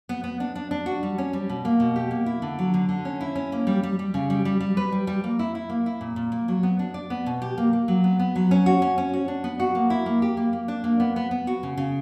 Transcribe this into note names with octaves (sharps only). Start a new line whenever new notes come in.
B3
B3
D4
D4
D4
F#4
G3
C#4
G3
B2
A#3
B2
G4
A#3
E4
D3
F#3
D3
D3
C#4
E4
C#4
A#3
G3
G3
G3
C#3
G3
G3
G3
B4
G3
G3
A#3
E4
E4
A#3
E4
A#2
A#2
A#3
F#3
B3
D4
D5
B3
B2
G4
A#3
A#3
F#3
B3
B3
F#3
C#4
F#4
C#4
C#4
F#4
D4
B3
F#4
A#3
E4
A#3
G4
A#3
A#3
D4
A#3
B3
B3
B3
F#4
C#3
C#3